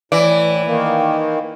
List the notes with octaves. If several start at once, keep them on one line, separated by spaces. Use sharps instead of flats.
A2 E3 D5
D#3 A#3